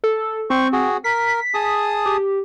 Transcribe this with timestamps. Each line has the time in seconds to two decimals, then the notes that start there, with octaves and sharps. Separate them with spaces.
0.04 A4
0.50 C4 C5 C#6
0.72 F#4 G#4
1.04 A#4 B6
1.54 G#4 A5 D#6
2.06 G4